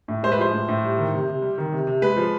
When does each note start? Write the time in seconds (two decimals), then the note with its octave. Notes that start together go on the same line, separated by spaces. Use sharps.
0.08 A2
0.23 G#3 C5
0.32 B4
0.38 F3 C5
0.53 A2
0.68 A2
0.83 G3
0.97 D#3
1.13 C3
1.28 C3
1.42 G3
1.58 D#3
1.73 C3
1.87 C3
2.02 G#3 B4
2.17 F3